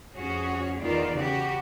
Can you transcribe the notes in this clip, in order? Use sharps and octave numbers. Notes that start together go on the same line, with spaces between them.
F2 C#4 F#4 G#4 C#5
E2 D#3 F4 D5
C#3 F#4 G4